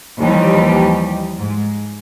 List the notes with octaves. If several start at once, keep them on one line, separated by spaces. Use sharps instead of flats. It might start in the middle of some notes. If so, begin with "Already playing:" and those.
D#2 E3 F3 G3 D#4 G4
G#2